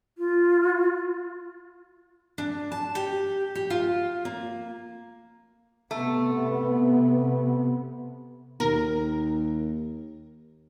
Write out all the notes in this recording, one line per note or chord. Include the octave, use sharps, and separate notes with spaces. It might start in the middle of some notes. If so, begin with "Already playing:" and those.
F4
D4
A5
G4
G4
F4
A#3
C3 A3 B3
D#2 A#4